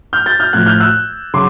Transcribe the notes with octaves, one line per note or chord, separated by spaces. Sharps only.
F6 G6
G6 A6
F6 G6
A2 F3 F#6 G#6
F6 G6
E6 F#6
C#3 F#3 C6 D6